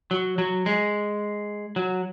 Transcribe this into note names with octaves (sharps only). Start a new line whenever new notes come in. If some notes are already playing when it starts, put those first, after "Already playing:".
F#3
F#3
G#3
F#3